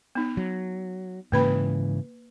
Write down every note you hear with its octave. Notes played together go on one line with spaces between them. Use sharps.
B3 D#4
F#3
G#2 C#3 E3 A#3 B4 B5